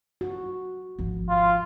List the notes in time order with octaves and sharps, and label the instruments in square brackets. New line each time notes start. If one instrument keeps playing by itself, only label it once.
[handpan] F#4
[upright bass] G#1 F3
[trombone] F4